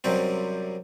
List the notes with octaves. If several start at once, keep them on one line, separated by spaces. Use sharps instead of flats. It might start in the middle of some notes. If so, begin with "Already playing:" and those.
F#2 C3 G3 C4